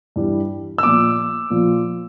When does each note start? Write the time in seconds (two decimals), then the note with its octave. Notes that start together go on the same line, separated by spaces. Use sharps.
0.16 G2 E3 G3
0.78 E6
0.83 A#2 F3 D6
1.50 A#2 F3